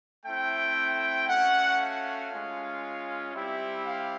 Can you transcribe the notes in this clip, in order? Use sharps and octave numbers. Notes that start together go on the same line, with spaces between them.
A3 C4 E4 G5
A3 C#4 F#4 F#5
F5
G#3 C#4 F4
G3 C4 E4 G4 E5
F5